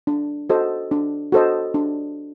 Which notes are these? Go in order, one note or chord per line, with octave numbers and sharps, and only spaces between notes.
D4
F#4 A4 C5 D#5
D4
F#4 A4 C5 D#5
D4